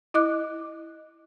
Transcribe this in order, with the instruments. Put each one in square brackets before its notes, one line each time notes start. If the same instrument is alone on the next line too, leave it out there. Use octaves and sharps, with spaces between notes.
[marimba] E4 D#5 D6 F#6